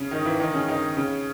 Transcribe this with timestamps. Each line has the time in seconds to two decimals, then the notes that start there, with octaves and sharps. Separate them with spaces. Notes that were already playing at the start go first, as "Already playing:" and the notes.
Already playing: C#3 C#4
0.11 D#3 D#4
0.25 E3 E4
0.40 D#3 D#4
0.54 C#3 C#4
0.68 D#3 D#4
0.97 C#3 C#4